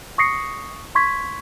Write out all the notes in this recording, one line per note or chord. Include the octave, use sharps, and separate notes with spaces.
C#6 D#6 A#6 C7 C#7
C6 C#6 G#6 B6